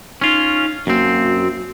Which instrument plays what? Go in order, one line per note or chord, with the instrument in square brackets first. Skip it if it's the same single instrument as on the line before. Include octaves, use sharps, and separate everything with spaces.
[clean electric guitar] C#4 F4 [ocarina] D#4
[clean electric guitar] F#2 C4 [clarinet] A#3 [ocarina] F#4